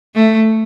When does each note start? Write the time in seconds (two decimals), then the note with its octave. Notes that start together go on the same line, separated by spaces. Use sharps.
0.14 A3